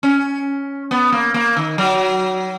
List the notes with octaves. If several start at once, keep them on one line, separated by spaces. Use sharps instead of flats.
C#4
B3
A#3
A#3
D#3
F#3